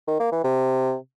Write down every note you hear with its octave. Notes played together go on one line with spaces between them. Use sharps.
D#3
A#3
E3
C3